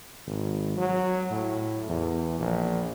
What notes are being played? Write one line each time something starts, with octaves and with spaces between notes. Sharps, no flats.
G#1
F#3
A2
E2
A#1